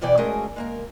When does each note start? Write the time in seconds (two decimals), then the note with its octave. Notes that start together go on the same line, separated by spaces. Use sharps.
0.01 E2 B2 E3 D5 G5
0.17 G#3 A3 C#4 F#4 G#4 A#4
0.56 G#3 A#3 A#4